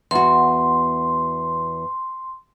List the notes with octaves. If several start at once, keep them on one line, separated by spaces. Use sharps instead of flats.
E2 F#4 C6